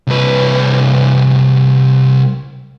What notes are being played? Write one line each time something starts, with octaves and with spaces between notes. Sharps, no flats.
C2 B4